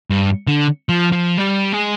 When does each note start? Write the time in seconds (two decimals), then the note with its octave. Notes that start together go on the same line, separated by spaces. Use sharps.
0.10 G2
0.47 D3
0.89 F3
1.12 F3
1.38 G3
1.73 G#3